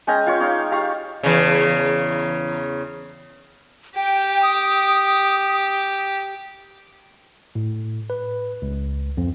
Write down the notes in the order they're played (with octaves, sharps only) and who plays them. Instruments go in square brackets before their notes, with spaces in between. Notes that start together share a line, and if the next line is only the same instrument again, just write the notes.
[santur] G#3 C#4 G5 A#5
F4 C#5
D#4 C#5 F5 D6
G4 F5 A#5 C#6
[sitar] E2 C#3
[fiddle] G4 [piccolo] G5
[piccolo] D#6
[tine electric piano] A2
B4
C#2
F2